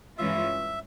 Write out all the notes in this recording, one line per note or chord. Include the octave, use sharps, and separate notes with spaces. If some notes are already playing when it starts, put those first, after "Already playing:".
G2 E3 G#3 C#4 F4 E5